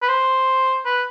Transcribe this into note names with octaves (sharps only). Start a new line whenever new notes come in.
B4
C5
B4